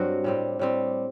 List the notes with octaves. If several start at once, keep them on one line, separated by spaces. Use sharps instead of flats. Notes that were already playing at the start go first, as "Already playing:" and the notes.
Already playing: G2 F#3 C4 F#4
A2 G3 C4
A2 G3 C4